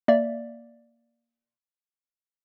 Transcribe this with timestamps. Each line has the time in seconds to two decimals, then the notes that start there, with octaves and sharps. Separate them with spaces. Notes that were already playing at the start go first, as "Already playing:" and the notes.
0.08 A#3 D5 E5